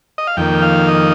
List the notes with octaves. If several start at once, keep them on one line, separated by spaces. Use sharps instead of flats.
D#5
F5
F2 D#3 A#3 G5
F5
D#5